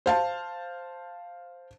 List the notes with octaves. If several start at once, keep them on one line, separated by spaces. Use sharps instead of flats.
C5 F5 A5